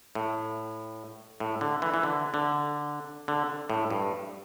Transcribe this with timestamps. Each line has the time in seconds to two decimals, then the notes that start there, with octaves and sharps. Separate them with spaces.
0.15 A2
1.40 A2
1.61 D3
1.82 E3
1.94 E3
2.03 D3
2.34 D3
3.28 D3
3.70 A2
3.90 G2